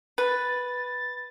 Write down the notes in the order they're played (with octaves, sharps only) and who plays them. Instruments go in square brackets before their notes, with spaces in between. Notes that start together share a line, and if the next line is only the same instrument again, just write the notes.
[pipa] B4 [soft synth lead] A6